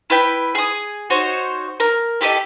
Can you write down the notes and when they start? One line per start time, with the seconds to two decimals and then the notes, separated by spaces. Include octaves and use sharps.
0.10 E4 B4 G5
0.55 G#4 D#6
1.10 D#4 F#4 C5 C#5
1.80 A#4
2.21 E4 G4 A4 D#5